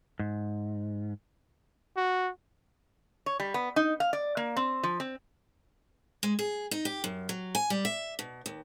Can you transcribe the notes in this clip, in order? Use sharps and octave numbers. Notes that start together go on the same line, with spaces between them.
G#2
F#4
C#5
G3
B3
D#4
F5
D5
A#3
C4
F3
C4
G#3
G#4
D#4
G4
F#2
F#3
G#5
G3
E5
B2
D#2